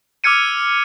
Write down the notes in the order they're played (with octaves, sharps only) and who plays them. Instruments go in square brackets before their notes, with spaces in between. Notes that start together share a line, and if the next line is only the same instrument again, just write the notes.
[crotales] D6 E6 F6 G#6 C#7 D#7